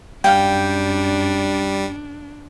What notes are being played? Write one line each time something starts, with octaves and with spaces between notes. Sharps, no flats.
F#2 G3 D4 F5 G5